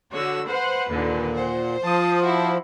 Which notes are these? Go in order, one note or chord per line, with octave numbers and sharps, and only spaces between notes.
D3 F#4 C#5 E6
B4 C5 F#5
D#2 A#2 D3
C5 F#5
F3 A5 D#6
E4 F#4